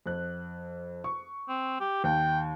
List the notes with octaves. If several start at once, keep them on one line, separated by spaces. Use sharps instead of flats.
F2 F#6
C#6
C4
G4
D#2 G5